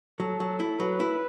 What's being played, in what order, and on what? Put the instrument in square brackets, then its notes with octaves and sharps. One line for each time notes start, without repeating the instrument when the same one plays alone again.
[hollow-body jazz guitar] F#3 [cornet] A4
[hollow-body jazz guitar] F#3
E4
[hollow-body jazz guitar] F#3 [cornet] B4
[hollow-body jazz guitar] E4